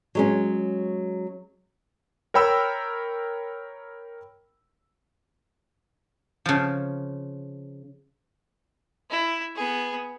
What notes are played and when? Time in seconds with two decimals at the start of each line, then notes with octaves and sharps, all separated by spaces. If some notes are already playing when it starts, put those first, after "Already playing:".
0.15 F#3 G#3 C#4
2.34 A#4 C#5 G5 B5 E6
6.46 C#3 F3
9.10 E4
9.55 B3 G#4